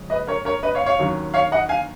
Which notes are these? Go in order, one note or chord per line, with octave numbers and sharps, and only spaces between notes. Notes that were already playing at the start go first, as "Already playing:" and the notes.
Already playing: F2 C#3 G#3 C#4
B4 D#5
A#4 C#5
A#4 C#5
B4 D#5
C#5 F5
C#5 F5
D#2 D#3 F#3 C#4
C#5 F5
D#5 F#5
F5 G#5